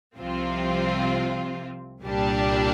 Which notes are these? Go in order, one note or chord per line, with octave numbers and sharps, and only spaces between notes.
C2 C3 F3 C4 F4
C2 A#2 G3 D4 G4